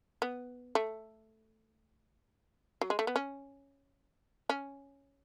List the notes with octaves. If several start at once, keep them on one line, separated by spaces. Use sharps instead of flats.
B3
A3
F#3
G#3
A3
B3
C#4
C#4